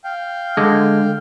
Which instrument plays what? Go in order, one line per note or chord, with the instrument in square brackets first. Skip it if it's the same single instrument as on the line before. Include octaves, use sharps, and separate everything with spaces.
[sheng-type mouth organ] F5 G5
[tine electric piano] D3 G#3